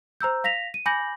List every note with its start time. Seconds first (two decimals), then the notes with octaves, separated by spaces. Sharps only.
0.21 C5 A#5 E6 G6
0.44 F5 A#6 B6 F7
0.74 D#7
0.86 G#5 B5 D6 G6 A#6 F#7